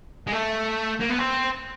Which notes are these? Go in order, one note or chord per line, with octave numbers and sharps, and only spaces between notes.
G#3
A3
A#3
B3
C4